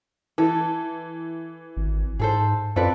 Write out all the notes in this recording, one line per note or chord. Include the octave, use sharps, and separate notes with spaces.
E3 A4
G#1
G#2 G#4 A4 C5
F#2 C4 F4 A4 B4 D5